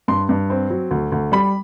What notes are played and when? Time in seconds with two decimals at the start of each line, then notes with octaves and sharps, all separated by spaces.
0.08 G2 C6
0.29 G2
0.50 C4
0.70 F#3
0.91 D2
1.12 D2
1.32 G3 B5